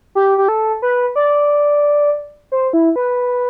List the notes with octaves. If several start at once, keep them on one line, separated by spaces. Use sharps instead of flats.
G4
G4
A4
B4
D5
C5
E4
B4